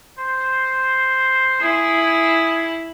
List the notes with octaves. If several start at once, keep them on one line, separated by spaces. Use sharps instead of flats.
C5
E4 G#4